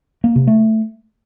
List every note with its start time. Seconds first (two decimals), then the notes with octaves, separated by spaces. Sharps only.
0.24 A#3
0.36 C3
0.47 A3